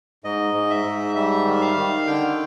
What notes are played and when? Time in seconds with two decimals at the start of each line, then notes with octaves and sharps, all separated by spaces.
0.24 G#2 D#5
0.54 G#2
0.70 E5
0.85 G#2
1.16 G3 E5
1.46 D#3
1.62 F5
1.77 D#3
2.07 D3 G5